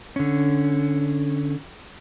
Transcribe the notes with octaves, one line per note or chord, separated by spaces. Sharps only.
D3 C#4